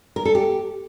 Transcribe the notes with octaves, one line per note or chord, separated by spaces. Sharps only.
A#4
A4
G4